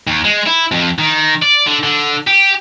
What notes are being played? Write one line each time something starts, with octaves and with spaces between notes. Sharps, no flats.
D#2
G#3
E4
F2
D#3
D5
D3
D3
G4